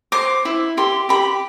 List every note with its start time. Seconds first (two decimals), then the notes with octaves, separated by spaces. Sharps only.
0.12 C5 D6
0.45 E4
0.77 G4 C6
1.09 G4 B5